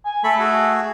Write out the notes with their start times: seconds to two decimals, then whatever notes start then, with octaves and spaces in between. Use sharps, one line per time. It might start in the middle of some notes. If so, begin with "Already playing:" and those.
0.05 G#5
0.24 A3 A4 B5
0.39 F#4 G#4